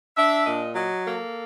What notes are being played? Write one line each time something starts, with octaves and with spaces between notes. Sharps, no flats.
D4 E5
A#2 D#5
F#3 D#5
A#3 A4